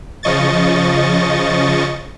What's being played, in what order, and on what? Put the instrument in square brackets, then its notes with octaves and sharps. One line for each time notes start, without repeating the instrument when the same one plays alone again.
[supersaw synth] C#3 F3 D#5 C#6 A6